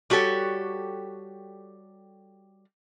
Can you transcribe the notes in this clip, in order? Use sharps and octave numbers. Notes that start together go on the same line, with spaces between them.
G3 F#4 G4 A4 C#5